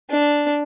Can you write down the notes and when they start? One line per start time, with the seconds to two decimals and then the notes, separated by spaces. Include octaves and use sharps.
0.10 D4